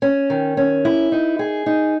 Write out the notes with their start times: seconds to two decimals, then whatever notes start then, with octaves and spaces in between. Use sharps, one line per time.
0.02 C#4
0.30 D#3
0.57 C#4
0.85 E4
1.12 D#4
1.39 G#4
1.66 D#4